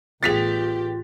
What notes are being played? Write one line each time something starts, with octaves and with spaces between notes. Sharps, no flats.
A1 B3 F4 G4 G#4 A6 B6 F7